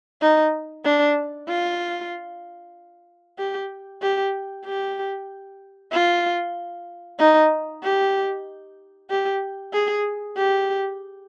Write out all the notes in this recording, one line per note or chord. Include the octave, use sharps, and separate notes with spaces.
D#4
D4
F4
G4
G4
G4
F4
D#4
G4
G4
G#4
G4